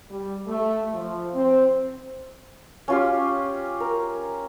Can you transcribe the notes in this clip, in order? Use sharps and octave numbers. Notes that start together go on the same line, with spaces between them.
G3
A3
F3
C4
C#4 F4 G4
A#4